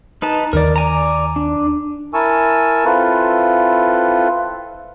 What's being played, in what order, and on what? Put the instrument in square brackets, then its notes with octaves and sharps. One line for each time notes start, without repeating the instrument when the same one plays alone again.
[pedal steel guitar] D#4 B4 A5
[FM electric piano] D#2 D#3 [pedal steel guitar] A#4 D5
[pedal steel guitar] D5 G#5 A#5
D4
[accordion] E4 A#4 G#5 A5 C#6 E6
C4 E4 F4 A4 B4